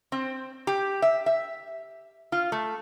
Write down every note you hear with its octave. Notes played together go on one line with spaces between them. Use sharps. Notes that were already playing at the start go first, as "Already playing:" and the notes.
C4
G4
E5
E5
F4
A3